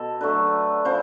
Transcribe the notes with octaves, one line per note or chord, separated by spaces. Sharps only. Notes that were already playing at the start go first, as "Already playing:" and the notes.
Already playing: B2 A4
D3 F#3 A3 B4
C#3 F3 C5